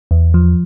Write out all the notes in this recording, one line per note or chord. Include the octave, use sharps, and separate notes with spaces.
E2
F3